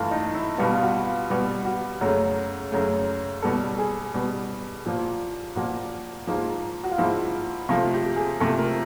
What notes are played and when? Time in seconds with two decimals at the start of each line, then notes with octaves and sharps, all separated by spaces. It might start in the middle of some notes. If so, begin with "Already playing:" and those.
Already playing: G2 E3 A3 F4
0.11 D#4
0.35 E4
0.58 B2 G3 B3 F4
0.75 F4
0.82 F#4
1.06 F4
1.30 B2 G3 B3
1.65 F#4
2.01 F#2 C#3 F#3 A3
2.72 F#2 C#3 F#3 A3
3.42 B2 G3 B3 A4
3.78 G#4
4.14 B2 G3 B3 G4
4.86 A#2 F3 A#3
5.56 A#2 F3 A#3 F#4
6.27 G#2 F3 A#3
6.84 F#4
6.92 F4
6.98 G#2 F3 A#3 E4
7.69 C3 F3 A3 F4
7.94 G4
8.16 G#4
8.40 C3 F3 A3 A4
8.58 A#4